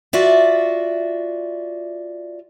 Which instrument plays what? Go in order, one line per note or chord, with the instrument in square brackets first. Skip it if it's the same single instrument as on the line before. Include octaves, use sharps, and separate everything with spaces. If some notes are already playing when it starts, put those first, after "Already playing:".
[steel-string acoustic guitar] F4 F#4 D5 E5